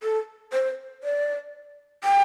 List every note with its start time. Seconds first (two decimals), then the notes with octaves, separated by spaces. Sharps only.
0.03 A4
0.53 C5
1.04 D5
2.04 G5